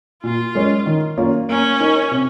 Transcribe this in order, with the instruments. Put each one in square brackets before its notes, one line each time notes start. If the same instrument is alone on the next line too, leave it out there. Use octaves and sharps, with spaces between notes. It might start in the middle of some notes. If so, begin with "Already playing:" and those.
[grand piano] A#2 [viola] F4
[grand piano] G#3 C#4
D#3
A#3 C#4 F4
[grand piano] A#3 [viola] C#4
[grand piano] D#4 A#4
C3